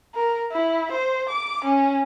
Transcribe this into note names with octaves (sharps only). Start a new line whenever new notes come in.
A#4
E4
C5
D6
C#4